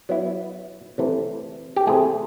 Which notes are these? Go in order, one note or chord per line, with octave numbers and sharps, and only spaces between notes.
F#3 B3 E4
C3 E3 A3
G4
C3 E3 A3 G#4